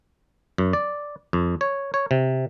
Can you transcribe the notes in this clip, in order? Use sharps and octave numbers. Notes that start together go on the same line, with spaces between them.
F#2
D5
F2
C#5
C#5
C3